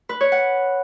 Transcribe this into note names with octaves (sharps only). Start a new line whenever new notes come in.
B4
C#5
F#5